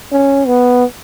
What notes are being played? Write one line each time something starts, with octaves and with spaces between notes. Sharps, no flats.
C#4
B3